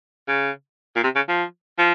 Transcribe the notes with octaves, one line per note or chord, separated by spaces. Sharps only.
C#3
A#2
C3
C#3
F3
F3